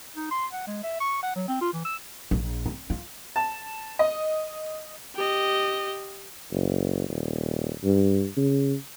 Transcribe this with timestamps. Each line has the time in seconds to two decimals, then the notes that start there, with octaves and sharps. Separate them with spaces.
0.17 D#4
0.31 C6
0.53 F#5
0.67 G#3
0.84 E5
1.00 C#6
1.23 F#5
1.36 F#3
1.48 C4
1.61 F4
1.73 E3
1.85 E6
2.31 A#1
2.66 C4
2.90 F4
3.36 A5
3.99 D#5
5.15 G4 D#5
6.51 F#1
7.09 D#1
7.84 G2
8.37 C#3